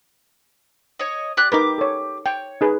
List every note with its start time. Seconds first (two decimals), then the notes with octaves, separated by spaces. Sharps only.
0.99 C#5 D#5
1.37 G4 D5 F#6
1.52 D#4 G4 A#4 B4 D6
1.78 A4 C#5
2.26 C#5 G5
2.61 D#4 G#4 B4